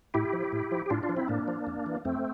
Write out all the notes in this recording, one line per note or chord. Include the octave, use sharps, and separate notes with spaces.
A2 E4 G4
F3
A2
F3
G4
A2 D4 F4
D4 F4
F3
C4 E4
A2 A#3 D4
F3
F2
E3
F2 A3 C4